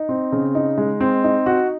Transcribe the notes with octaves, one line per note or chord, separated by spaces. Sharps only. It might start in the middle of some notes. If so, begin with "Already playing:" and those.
Already playing: D#4
C4
C#3
D#4
G#3
C4
D#4
F#4